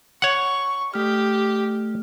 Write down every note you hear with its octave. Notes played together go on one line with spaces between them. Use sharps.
C#5 F#5 C#6
A3 G4 F6